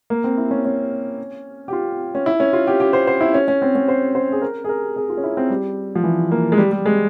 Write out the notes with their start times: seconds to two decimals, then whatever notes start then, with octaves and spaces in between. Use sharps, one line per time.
0.10 A#3
0.24 C4
0.38 E4
0.51 C#4
0.65 C#4
1.68 G4
1.73 F4
2.15 C#4
2.26 E4
2.40 C#4
2.53 F4
2.67 G4
2.80 G4
2.93 C5
3.07 C5
3.21 E4
3.34 C#4
3.48 C#4
3.62 C4
3.75 C#4
3.88 C5
4.15 C5
4.32 G#4
4.42 A#4
4.64 G#4
4.69 A#4
4.96 G#4
5.10 F4
5.17 C#4
5.24 E4
5.37 C4
5.50 G3
5.95 F3
6.04 E3
6.31 A#3
6.52 G#3
6.58 G3
6.72 G3
6.86 G#3